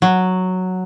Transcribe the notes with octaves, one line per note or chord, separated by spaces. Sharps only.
F#3